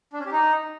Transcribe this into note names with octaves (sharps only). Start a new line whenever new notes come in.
D4
C#4
G4
D#4